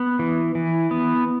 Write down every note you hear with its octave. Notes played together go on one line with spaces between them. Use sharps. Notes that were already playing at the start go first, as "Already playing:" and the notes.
Already playing: B3
E3
E3
B3